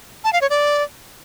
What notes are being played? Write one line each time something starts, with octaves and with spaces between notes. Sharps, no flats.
A5
F5
C#5
D5